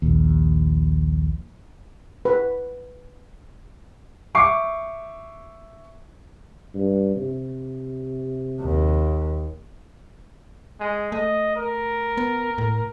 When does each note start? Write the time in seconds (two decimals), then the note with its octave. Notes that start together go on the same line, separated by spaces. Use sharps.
0.02 A#1 D#2
2.25 B4
4.35 E5 C#6 D6 C7
6.75 G2
7.16 C3
8.61 D#2
10.80 G#3
11.12 A3 D#5
11.56 A#4
12.17 B3
12.58 A2